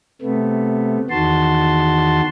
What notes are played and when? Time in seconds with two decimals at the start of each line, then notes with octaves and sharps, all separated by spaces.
0.22 C3 A3 B3
1.10 E2 D#3 F#4 A5 C6